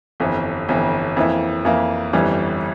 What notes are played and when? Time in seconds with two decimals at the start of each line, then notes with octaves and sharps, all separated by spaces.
0.20 G1 F2 E3
0.69 G1 F2 E3
1.17 F2 E3 A#3 E4
1.65 F2 E3 A#3 E4
2.13 G1 F2 E3 G3